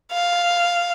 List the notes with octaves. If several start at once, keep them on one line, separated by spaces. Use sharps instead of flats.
F5